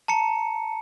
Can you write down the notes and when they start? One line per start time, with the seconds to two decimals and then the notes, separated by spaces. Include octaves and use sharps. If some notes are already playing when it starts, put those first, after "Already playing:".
0.08 A5 A#5 C#7